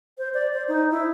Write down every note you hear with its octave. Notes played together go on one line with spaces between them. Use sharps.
C5
D5
C5
D#4
E4